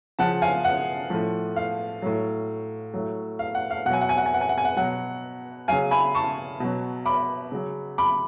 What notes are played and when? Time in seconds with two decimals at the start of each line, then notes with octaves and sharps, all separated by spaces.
0.19 C#3 F3 F#5 A5
0.42 F5 G#5
0.65 F#5
1.10 A2 F3
1.56 F5
2.02 A2 F#3
2.94 A2 F#3
3.39 F5
3.55 F#5
3.71 F5
3.86 B2 F#5
3.90 F#3 G#5
4.01 F#5
4.09 G#5
4.18 F#5
4.26 G#5
4.34 F#5
4.41 G#5
4.49 F#5
4.58 G#5
4.65 F#5
4.77 B2 F#3 F#5
5.68 C#3 F#3 F5 G#5
5.91 G#5 B5
6.15 A5 C#6
6.60 B2 F#3
7.06 B5 D6
7.52 C#3 F#3
7.98 B5 D6